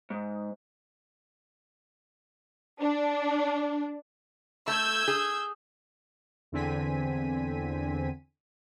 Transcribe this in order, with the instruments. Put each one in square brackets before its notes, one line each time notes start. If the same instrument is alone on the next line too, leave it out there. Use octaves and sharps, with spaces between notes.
[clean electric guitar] G#2
[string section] D4
[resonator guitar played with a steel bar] A3 [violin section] E6 G6 G#6
[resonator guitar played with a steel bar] G#4
[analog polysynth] E2 D3 C4 G#5 B6 D#7